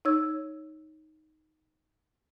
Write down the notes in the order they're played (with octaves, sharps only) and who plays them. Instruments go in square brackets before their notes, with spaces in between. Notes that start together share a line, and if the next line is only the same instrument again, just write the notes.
[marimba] D#4 C#5 E6 G#6